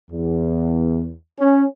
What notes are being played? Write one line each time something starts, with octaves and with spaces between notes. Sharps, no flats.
E2
C#4